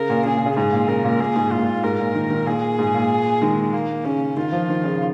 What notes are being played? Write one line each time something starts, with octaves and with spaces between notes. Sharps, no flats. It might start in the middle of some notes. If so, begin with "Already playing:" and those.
Already playing: C#3 A#4
A#2
C#3 G#4
A#2
C#3
G#2 G#4
A#2
C#3 A#4
A#2
A#2 G#4
G#2
A#2 F4
G#2
A#2
G#2 A#4
A#2
D#3
D#3
A#2 G#4
G#2
A#2
D#3 G#3
A#3
C#3 C#4
D#3 F4
F3
D#3
C#3